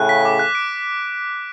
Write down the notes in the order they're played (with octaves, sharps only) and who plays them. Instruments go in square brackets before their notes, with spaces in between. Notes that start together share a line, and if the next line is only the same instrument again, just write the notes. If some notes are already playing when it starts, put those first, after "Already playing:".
Already playing: [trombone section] A2 C#3 [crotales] F#6
[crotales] B6
D6
F#6
D7